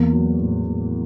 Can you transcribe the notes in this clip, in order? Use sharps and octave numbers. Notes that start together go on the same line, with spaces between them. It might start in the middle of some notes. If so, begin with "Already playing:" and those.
Already playing: E2 A#3
F#3
A2
A2